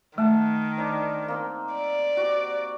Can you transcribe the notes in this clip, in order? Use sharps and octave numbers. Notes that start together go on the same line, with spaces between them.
D#3 A3 F#5 A5
D4 D#4 C5
A#3 C4 D#4
D5
F#4 G4